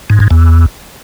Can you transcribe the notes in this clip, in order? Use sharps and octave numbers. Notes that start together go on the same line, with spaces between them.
G#2
G#2
E2